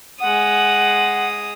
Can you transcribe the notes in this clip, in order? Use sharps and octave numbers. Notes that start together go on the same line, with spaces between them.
G#3 F#5 D#6